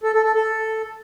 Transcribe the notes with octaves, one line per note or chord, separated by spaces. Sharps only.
A4
A4
A4
A4